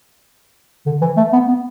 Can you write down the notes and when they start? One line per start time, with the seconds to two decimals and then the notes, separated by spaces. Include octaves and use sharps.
0.86 D3
1.02 E3
1.17 A3
1.33 B3
1.48 B3